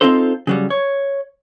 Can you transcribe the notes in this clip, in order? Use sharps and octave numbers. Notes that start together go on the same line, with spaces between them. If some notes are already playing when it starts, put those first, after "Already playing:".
C4 C#4 D#4 F4 A4 C5
C#3 F#3 G3
C#5